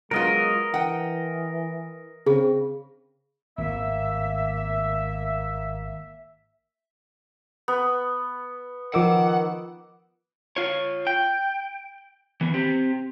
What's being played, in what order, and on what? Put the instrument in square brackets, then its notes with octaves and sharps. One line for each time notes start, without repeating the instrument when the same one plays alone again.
[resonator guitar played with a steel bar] F#3 B3 F4 [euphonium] G#3 [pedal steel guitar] A#4 D#5
[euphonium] E3 [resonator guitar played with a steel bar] F#5 G5
[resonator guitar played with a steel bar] C#3 [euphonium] C4 [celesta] G#4
[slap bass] G#1 A2 [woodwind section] A#3 E5
[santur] B3
[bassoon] D#3 [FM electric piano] F3 D6 E6 [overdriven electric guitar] F#5
[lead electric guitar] F4 C#5
G5
E3 B3
C4 G4